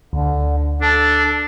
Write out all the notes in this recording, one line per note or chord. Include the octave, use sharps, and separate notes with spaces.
D2 D3
D4 A4